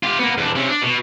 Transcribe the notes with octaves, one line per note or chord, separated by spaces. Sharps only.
F4 G4
A#3 B3
E2 D4
C3 C#4
D4
B2